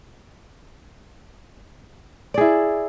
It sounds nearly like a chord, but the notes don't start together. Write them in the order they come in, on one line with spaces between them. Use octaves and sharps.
D5 G#4 E4